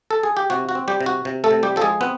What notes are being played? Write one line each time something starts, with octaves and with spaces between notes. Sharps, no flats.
A4
G#4
G4
C3 F#4
F#4
C4
G3 G4
C3
F#4
C3
A3 A4
C3
G3 G4
F3 A4
G#3 G#4
B3 C4 B4